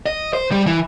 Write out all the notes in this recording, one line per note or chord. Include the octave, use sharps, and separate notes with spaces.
D#5
C5
G3
E3